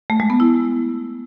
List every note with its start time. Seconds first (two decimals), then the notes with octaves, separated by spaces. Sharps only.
0.10 A3
0.20 G#3
0.30 B3
0.40 E4